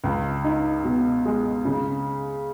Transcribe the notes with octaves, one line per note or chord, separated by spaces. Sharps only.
C#2
D#4
B2
G#3
C#3